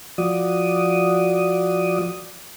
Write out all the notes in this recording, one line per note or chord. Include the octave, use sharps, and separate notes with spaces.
F3 F#4 D5 D#6